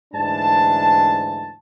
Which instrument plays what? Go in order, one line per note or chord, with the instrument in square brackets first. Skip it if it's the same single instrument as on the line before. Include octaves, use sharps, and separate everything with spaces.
[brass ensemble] D2 G#2 E3 D4 A5